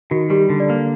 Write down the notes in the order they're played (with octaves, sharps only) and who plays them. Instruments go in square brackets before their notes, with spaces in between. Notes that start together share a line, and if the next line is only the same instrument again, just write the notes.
[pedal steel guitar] D#3 [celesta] F#4
[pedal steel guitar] G3 [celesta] G4
[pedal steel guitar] D3
[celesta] D5
[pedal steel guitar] A#3